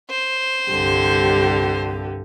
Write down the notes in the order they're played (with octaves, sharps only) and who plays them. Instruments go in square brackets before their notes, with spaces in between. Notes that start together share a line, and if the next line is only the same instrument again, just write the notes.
[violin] C5
[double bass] C2 G2 [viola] D3 G4